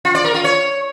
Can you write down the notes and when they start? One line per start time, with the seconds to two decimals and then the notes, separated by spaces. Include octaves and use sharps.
0.05 F4
0.15 D5
0.25 A#4
0.34 F4
0.44 C#5